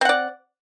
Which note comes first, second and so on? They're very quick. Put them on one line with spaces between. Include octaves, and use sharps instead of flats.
C4 F#5 D5